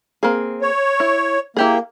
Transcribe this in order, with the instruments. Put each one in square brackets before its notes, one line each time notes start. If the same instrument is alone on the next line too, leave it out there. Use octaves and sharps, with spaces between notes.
[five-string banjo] A#3 C4 G#4
[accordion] C#5
[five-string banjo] E4
[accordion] A#3 [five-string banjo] E4 G4 G#4